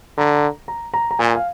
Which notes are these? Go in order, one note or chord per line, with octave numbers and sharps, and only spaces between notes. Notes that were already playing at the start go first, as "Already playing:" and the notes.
D3 A#5
A#5
A#5
A#5
A#5
A#2 G#5
F5